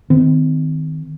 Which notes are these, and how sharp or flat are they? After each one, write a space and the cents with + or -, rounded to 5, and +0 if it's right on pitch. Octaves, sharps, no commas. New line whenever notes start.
D#3 +5 C4 -40